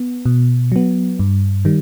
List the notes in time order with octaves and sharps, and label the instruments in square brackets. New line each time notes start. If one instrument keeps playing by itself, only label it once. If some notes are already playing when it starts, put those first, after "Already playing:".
Already playing: [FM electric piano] B3
B2
F#3 B3
G2
D#3 G3